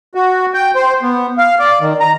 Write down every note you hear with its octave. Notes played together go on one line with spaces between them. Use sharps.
F#4
G5
C5
B3
F5
D5
D#3
A#5